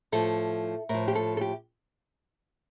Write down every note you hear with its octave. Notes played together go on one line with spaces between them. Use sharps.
A2 F3 A4
A2 A#4
F3
G4
A4
A4
G4